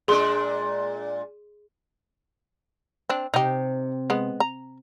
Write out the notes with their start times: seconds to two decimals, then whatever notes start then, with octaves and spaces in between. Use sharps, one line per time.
0.08 A#2 G#3 D4 G#4 C6
3.09 C4 D4
3.34 C3 D#4 G4
4.10 G#3 B3
4.40 A#5